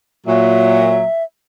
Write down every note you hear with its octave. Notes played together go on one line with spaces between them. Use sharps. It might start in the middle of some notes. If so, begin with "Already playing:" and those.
A#2 F#3 E5